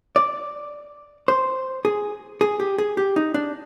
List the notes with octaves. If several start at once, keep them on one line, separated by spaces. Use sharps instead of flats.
D5
C5
G#4
G#4
G4
G#4
G4
D#4
D4